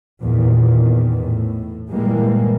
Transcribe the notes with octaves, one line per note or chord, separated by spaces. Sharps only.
E2 A#2 D#3
A2
A#2 E3 G3 G#3 A#3